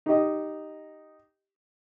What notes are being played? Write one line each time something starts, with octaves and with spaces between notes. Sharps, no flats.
D#4 G4 D#5